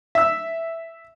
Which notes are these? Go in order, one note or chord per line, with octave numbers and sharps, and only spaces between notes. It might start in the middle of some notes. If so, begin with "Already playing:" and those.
E5 E6